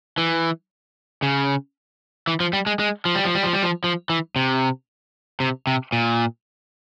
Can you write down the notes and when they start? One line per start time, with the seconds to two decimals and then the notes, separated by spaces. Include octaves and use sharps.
0.18 E3
1.22 C#3
2.27 E3
2.40 F3
2.53 G3
2.66 G#3
2.79 G#3
3.05 F3
3.15 G3
3.25 F3
3.35 G3
3.43 F3
3.53 G3
3.63 F3
3.84 F3
4.10 E3
4.36 C3
5.40 C3
5.67 C3
5.92 A#2